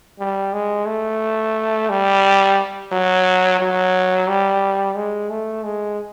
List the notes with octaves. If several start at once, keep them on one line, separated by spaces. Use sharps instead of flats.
G3
G#3
A3
G3
F#3
F#3
G3
G#3
A3
G#3